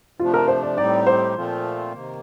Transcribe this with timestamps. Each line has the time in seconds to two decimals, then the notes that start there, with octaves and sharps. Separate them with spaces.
0.19 C3 F3 A3 D4 F4
0.34 A#4
0.48 C5
0.63 D5
0.77 A2 G3 C4 D#4 G4 D5
1.07 C5
1.35 A#2 F3 A3 C4 F4
1.92 C3 D#3 A#3